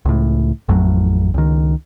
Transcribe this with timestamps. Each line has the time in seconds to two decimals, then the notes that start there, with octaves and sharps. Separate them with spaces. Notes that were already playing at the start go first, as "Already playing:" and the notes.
0.05 C#2 A2
0.69 A1 F2 A2 F#3
1.34 C#2 D#3